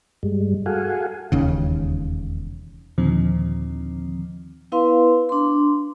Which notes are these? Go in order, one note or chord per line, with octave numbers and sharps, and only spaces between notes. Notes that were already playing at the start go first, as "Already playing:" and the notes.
G2 G3 G#3
F#4 G#4 A4 F5 F#5 G#5
E1 D#2 C#3
D#2 A#2 D3 D#3 F3 C4
B3 E4 B4 F5 C6
D4 C6